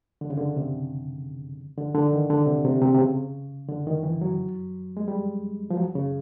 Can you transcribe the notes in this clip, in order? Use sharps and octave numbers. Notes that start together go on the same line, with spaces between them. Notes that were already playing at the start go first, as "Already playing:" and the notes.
D3
C#3
D3
C3
D3
D3
D#3
D3
C3
C3
C3
C3
C#3
D3
D#3
E3
F#3
G#3
G3
F3
F#3
C#3